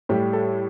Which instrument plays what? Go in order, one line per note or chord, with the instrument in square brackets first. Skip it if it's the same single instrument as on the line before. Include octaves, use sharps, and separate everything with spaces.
[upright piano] A2 G3 G4
A4